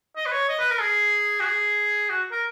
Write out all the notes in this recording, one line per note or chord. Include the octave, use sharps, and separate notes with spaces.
D#5
B4
C#5
D#5
B4
A#4
G#4
F#4
G#4
F#4
A#4